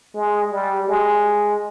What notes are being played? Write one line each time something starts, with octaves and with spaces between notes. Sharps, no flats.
G#3
G3
G#3